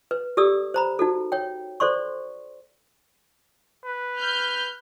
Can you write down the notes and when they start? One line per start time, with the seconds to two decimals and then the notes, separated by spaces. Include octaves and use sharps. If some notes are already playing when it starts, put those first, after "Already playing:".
0.11 B4
0.37 G4 A4 D5 D#6 E6
0.74 C5 A#5 B5
0.99 D#4 F#4 A4
1.32 C#5 G5
1.80 A4 C5 D5 C6 C#6
3.85 B4
4.19 F6 G6